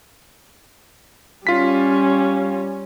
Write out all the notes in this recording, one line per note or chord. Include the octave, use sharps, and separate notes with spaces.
G3 C#4 F4 B6